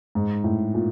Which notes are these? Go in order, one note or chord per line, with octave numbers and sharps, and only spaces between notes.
G#2
A2
A#2